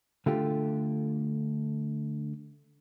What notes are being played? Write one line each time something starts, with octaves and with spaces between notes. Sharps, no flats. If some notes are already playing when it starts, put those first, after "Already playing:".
D3 A3 F4 G4